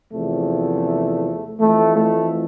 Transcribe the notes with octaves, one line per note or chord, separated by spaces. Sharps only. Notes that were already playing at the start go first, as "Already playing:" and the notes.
E2 C3 F3 A3
F2 E3 A3
A3